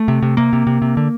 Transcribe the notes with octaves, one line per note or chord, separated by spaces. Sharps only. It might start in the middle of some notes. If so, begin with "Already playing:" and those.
Already playing: A3
C3
C3
C3 A#3
C3
C3
C3
D3